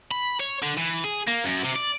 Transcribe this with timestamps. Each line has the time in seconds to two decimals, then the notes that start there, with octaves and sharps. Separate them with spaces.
0.11 B5
0.40 C#5
0.63 D3
0.78 E3
1.04 G#4
1.28 A#3
1.45 F#2
1.64 C3
1.76 D5